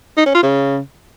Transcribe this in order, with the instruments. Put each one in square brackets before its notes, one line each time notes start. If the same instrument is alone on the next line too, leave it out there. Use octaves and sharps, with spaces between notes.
[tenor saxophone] D#4
C#4
F4
C#3